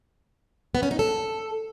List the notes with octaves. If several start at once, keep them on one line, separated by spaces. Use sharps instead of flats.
B3
C#4
D#4
A4